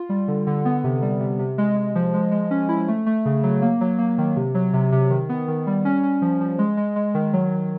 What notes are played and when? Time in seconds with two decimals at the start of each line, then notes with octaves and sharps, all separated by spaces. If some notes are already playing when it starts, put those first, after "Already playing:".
Already playing: F4
0.09 G3
0.28 D3
0.47 D3
0.65 B3
0.84 C3
1.02 G3
1.20 C3
1.39 C3
1.58 G#3
1.77 G#3
1.95 F3
2.14 G#3
2.32 G#3
2.51 C#4
2.69 E4
2.88 A3
3.06 A3
3.25 C#3
3.43 F#3
3.62 A#3
3.81 F#3
3.99 A#3
4.18 D#3
4.36 C3
4.55 F#3
4.73 C3
4.92 C3
5.10 D#3
5.29 B3
5.48 D#3
5.67 G3
5.85 C#4
6.03 C#4
6.22 F3
6.41 F3
6.59 G#3
6.77 G#3
6.96 G#3
7.14 D#3
7.33 F#3
7.52 F#3